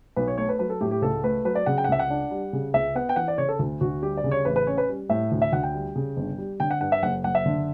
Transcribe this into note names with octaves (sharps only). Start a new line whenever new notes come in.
B1 B4
C#5
A3 C#5
B4
F#3 B4
A4
A2 G4
G4
C#2 A4
A3 B4
F#3 B4
D5
C#3 F#5
G5
F#5
C#2 E5
F#5
D4
G3
C#3
C#2 E5
B3 F#5
G5
E3 F#5
D5
C#3 C#5
A4
D2
D2 F#4
G3 G4
D5
C#3
C#5
A1 B4
B4
C#4 C#5
B4
G3
A2 E5
D2
E5
D2 F#5
G5
G3
C#3
G1
G3
D3 G5
F#5
G2 F#5
E5
F#1 F#5
F#1 F#5
E5
D3